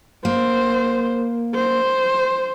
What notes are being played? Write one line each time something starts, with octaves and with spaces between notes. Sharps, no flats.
A#3 C5
C5